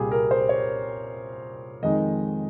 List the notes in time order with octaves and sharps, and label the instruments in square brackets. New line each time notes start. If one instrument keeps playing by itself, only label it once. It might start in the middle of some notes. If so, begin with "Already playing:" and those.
Already playing: [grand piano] C2 A#2 G3 G4 G#4
A#4
C5
C#5
F2 D#3 G#3 D#4 D#5